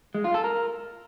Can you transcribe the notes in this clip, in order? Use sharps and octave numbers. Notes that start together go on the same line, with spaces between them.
G#3
F4
A4
A#4